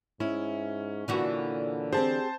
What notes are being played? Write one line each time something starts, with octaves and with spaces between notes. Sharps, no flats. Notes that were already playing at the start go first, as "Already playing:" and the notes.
G#2 C#4 E4
A#2 D3 E3 F#4
C4 G4 G#4 C5 A5